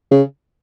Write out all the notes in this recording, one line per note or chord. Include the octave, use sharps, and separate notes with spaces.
C#3